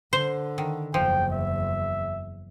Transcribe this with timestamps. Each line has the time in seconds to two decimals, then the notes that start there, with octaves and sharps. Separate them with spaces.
0.13 D3 C5
0.58 D#3
0.94 F#1 E2 F3 G5
1.32 E5